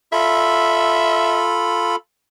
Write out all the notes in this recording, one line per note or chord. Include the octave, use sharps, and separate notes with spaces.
F4 A4 E5 B5